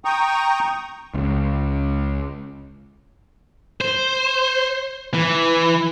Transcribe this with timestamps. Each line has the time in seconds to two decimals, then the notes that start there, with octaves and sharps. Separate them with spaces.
0.05 G5 A#5 C#6 D#6
1.14 C#2
3.81 C5
5.14 E3